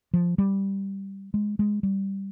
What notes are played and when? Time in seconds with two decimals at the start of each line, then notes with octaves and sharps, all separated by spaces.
0.13 F3
0.38 G3
1.34 G#3
1.59 G#3
1.83 G3